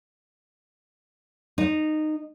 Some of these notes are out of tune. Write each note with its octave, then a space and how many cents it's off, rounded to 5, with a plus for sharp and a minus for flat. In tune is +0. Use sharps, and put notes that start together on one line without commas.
D#4 -15